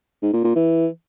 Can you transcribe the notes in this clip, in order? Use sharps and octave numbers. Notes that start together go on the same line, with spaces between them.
G#2
A#2
A#2
E3